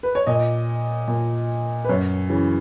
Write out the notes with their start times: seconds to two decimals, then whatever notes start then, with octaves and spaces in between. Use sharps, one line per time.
0.03 B4
0.15 C#5
0.27 A#2 D#5
1.08 A#2
1.84 B4
1.89 F#2 C#5
2.29 C#3 E3